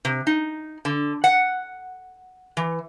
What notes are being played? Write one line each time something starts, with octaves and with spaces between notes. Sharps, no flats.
C3
D#4
D3
F#5
E3